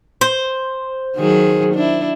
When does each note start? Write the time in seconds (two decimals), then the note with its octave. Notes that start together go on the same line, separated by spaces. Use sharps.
0.21 C5
1.16 D#3 F#3 G#4
1.74 D4 E4